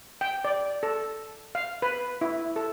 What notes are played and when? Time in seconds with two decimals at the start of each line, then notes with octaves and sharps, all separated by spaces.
0.21 G5
0.45 D5
0.83 A4
1.55 F5
1.82 B4
2.21 E4
2.56 A4